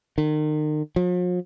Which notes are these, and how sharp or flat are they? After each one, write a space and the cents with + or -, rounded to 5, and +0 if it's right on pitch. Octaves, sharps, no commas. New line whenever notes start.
D#3 -35
F3 +45